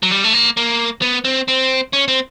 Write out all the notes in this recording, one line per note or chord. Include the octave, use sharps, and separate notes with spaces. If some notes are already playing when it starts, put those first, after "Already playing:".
F#3
G3
A3
A#3
A#3
B3
C4
C4
C#4
C4